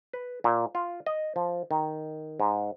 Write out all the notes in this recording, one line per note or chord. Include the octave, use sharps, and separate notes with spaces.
B4
A#2
F4
D#5
F3
D#3
G#2